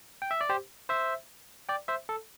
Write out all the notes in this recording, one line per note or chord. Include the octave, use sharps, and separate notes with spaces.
G5
E5
D5
G4 C5
C5 E5
D5 G5
C5 E5
A4